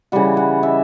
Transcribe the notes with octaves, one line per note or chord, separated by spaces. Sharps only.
C#3 E3 G3 F#5
F#5
E5